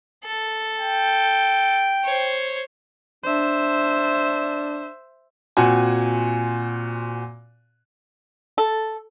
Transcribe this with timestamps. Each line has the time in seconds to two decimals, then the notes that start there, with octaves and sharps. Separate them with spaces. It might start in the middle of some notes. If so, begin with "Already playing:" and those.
0.25 A4
0.80 G5
2.04 C5 C#5
3.24 D4 C5 E5
5.57 A#2 C4 F#4 G#5
8.58 A4